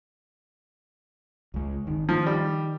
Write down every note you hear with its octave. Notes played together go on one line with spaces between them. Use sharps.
C#2 G#3
G#1 D#3
D#3 F3
G3